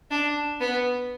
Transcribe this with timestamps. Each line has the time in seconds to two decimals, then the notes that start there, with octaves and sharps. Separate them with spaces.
0.11 D4
0.60 B3